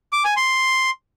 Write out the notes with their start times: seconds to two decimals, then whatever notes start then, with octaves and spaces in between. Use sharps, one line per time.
0.13 D6
0.25 G#5
0.36 C6